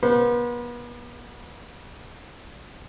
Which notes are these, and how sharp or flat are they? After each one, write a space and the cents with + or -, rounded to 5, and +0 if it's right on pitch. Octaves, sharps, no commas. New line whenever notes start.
B3 -40 C5 -30